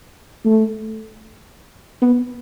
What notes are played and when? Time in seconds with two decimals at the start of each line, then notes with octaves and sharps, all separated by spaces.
0.45 A3
2.02 B3